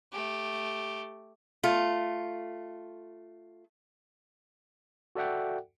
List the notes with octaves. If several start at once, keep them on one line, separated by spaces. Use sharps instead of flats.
A3 G4
A3 F4
F#4 A4 D5 E5 F#5 G5